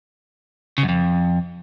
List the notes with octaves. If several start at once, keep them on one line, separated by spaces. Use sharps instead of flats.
C#3
F#2
F2